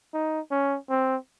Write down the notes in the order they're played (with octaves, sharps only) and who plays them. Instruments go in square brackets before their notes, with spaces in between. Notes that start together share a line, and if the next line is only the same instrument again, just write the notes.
[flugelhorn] D#4
C#4
C4